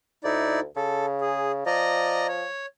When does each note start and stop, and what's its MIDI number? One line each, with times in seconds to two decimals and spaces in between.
0.24 0.65 38
0.24 0.60 63
0.24 0.60 64
0.24 0.60 74
0.76 1.66 49
0.76 1.06 69
1.21 1.52 68
1.66 2.45 53
1.66 2.27 74
1.66 2.27 75
1.66 2.27 82
2.28 2.66 73